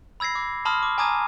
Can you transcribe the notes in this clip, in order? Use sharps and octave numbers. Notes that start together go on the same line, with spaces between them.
B5 E6 G#6 A#6 C7
D6
A5 B5 C6 D#6 F6
D6
G#5 A#5 D6 D#6 G#6 D#7